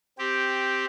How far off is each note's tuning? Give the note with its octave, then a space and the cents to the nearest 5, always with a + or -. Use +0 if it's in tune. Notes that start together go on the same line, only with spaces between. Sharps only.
C4 +0 G4 +0